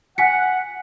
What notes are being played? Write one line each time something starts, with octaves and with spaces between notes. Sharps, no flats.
F#5 G#5 B6 C#7